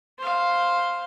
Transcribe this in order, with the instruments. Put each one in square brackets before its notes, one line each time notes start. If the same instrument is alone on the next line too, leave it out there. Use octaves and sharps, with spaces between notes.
[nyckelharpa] C5 F5